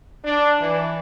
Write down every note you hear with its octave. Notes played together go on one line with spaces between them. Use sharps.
D4
E3